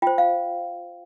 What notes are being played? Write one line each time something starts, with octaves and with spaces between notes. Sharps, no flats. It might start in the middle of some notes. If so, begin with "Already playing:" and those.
F4 C5 G5
F5